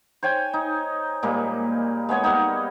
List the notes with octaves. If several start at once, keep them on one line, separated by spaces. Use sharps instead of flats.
C5 C#5 G5 G#5
D#4
A#2 G3 G#3 A#3
G#3 B3 C#5 G#5
G3 A#3 B3 D#4